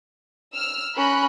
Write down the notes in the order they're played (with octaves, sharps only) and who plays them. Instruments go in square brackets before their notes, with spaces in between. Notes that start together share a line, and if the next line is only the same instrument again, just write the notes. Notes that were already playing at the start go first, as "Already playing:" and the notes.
[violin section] E6 F6
[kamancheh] C#4 [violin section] A#4 B5 F#6